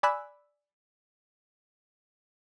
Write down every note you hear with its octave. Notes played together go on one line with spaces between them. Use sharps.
D5 G#5 B5 E6 F#6